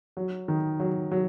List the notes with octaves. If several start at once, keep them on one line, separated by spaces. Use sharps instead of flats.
F#3
D#3
F#3
F#3